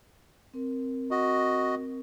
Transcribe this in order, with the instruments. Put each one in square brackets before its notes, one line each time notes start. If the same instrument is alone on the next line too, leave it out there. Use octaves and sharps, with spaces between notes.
[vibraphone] C4 A#4
[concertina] F#4 D#5